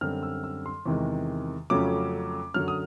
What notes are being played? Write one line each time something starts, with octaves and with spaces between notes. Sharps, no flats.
F#2 D3 G3 C4 F6
E6
E6
C6
E2 C3 D#3 G#3
F2 C#3 F#3 A3 C#4 D6
F#2 D3 F#3 F6
D#6